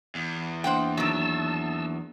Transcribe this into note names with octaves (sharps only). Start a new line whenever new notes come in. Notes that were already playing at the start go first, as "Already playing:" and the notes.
E2
A#3 D4 C5 E5 F#5 G5
D#3 F#3 A5 E6